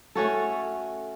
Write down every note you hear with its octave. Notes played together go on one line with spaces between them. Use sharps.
A3 C#4 F#4 A4